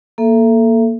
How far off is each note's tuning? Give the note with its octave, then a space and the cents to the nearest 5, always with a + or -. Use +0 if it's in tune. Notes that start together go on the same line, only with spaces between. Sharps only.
A#3 +0 A4 +0 E5 +30